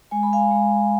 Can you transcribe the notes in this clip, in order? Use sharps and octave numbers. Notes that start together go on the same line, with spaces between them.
G#3 G#5
B5
F5 G#5
G#3